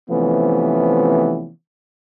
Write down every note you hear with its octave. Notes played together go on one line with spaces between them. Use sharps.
C3 E3 F3 A3 B3 C#4